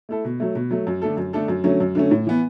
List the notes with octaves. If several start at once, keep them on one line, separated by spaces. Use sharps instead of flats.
A3 E4 A4
B2
F#3 A3
B2
F#3 A3
F#2
D3 A3 D4 A4
F#2
D3 A3 D4 A4
F#2
D3 F#3 A3 C#4
F#2
D3 F#3 A3 C#4
A2
E3 B3